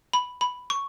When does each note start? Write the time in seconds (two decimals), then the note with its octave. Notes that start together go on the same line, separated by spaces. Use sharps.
0.13 B5
0.41 B5
0.70 C#6